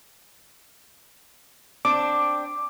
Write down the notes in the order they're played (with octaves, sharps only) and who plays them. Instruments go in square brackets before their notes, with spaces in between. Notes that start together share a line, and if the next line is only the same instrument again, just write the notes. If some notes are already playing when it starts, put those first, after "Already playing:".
[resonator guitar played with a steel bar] C4 D4 [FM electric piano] D6